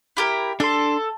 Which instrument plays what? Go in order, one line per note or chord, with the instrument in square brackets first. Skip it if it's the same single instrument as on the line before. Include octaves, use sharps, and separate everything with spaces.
[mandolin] E4 G4 A#4
[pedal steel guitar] D4 C6 [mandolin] A4